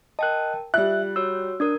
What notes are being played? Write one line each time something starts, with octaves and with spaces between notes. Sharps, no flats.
A#4 D#5 G5 A5 F#6
G3 F4 E5 F#6
F#4 C#5 E6
D4 A#4 D#6 G#6